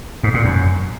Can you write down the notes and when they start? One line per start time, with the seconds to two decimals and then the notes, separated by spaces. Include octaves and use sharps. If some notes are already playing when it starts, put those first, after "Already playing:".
0.23 G#2
0.34 A#2
0.45 F#2